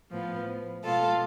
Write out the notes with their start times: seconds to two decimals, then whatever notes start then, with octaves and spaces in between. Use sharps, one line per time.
0.12 A2 F3 B3
0.84 B2 G#3 B3 F4 A4